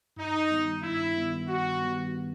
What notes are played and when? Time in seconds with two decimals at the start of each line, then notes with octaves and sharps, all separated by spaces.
0.17 G2 D#4
0.50 D#3 G3 B3
0.82 G2 E4
1.15 D#3 G3 B3
1.48 G2 F#4
1.81 D#3 G3 B3